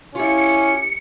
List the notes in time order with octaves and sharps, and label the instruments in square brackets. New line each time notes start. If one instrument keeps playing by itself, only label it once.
[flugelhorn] C#4 [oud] E4 F4 [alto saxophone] G4 [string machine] C#7